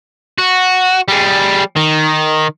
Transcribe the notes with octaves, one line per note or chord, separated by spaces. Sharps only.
F#4
G3 G#4
D#3